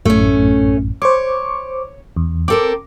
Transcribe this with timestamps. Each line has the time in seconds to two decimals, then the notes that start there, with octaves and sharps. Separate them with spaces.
0.05 A1 F#2 A2 A3 C#4
1.02 C5 C#5 C#6 D6
2.17 E2
2.48 C4 A4 A#4 D6